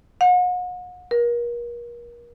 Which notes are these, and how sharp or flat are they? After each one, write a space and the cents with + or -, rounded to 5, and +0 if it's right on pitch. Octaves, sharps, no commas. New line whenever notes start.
F#5 -40
A#4 +35